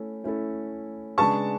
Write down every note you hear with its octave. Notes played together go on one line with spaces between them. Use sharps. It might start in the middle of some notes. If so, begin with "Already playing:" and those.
Already playing: A3 C#4 E4 A4
A3 C#4 E4 A4
C#3 G#3 D4 G#4 B4 A5 C#6